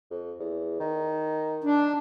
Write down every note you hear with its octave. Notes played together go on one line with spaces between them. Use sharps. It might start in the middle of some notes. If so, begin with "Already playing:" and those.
F2
E2
D#3
D4